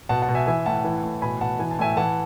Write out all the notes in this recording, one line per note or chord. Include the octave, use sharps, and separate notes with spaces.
B2 F#5 A5
F#5 A5
B2
E5 G#5
E3 E5 G#5
A2 F#5 A5
E3
A2
B2 G#5 B5
B2 F#5 A5
E3 G#5
A5
A2 E5 G#5
E3 F#5 A5